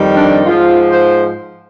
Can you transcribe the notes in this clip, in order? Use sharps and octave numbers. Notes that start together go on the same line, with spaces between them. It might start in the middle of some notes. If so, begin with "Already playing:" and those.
Already playing: F2 D#3 G3
D4
G#2 F3 F4
C5